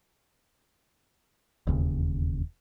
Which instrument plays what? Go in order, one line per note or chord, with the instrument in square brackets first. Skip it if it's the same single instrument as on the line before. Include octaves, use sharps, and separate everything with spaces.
[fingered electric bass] E1 D#2 C#3